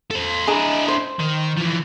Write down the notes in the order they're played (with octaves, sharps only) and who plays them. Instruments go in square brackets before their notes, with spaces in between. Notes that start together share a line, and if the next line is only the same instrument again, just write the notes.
[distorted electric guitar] A4 C5
[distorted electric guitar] D4 E4 [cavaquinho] G#4 D#5 A#5
[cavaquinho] C5
[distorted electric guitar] D#3
E3 F3